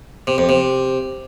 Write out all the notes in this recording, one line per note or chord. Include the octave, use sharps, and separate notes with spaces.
C3
F2
C3